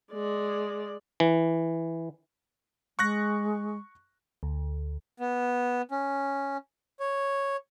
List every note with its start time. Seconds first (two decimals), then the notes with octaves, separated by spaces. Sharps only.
0.12 G#3 D5
1.20 E3
2.99 G#3 C#6 F#6 A#6
4.43 D2
5.20 B3
5.91 C#4
7.00 C#5